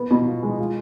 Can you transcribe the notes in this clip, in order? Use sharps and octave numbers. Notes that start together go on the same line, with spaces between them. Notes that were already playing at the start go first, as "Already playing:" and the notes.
Already playing: B3
B2
F4
G#3
F4